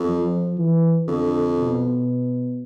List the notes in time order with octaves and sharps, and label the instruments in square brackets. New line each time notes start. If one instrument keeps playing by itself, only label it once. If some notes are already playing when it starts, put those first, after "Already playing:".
Already playing: [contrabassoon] F2
[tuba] F3
E3
[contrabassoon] F2 [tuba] D3
[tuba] B2